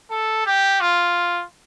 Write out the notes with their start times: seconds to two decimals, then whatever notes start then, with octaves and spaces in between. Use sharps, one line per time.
0.11 A4
0.46 G4
0.80 F4